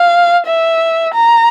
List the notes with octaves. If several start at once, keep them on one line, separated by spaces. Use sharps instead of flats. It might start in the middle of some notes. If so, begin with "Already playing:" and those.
Already playing: F5
E5
A#5